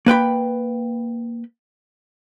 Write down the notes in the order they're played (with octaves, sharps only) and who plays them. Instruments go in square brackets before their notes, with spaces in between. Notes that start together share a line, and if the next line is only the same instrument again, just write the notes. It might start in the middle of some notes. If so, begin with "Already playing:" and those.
[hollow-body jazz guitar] A#3 B4 G5 B5